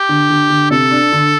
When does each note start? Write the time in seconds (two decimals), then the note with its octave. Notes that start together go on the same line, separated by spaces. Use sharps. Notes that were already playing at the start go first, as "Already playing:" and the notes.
Already playing: G4
0.09 D3
0.30 D3
0.50 D3
0.71 C3 A4
0.91 D4
1.12 D3